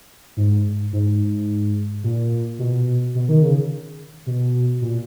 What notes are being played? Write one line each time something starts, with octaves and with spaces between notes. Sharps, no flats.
G#2
G#2
A#2
B2
B2
D#3
C#3
B2
A#2